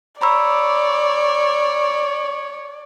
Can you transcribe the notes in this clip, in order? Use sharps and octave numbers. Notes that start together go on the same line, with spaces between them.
C#5 D5 A#5 B5 E6